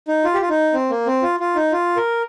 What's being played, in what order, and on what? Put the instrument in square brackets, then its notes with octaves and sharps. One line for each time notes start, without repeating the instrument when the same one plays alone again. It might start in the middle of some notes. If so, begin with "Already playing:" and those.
[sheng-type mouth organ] D#4
F4
G4
F4
D#4
C4
A#3
C4
F4
F4
D#4
F4
A#4